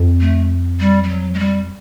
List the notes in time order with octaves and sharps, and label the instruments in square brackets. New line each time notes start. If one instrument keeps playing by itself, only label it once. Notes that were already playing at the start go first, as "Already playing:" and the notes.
Already playing: [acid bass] F2
[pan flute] A3
G3
G3
F#3
G#3
G3